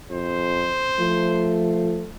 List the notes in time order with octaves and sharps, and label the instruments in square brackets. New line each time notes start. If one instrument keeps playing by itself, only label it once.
[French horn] F2 [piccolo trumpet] C5
[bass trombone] F3 [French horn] A3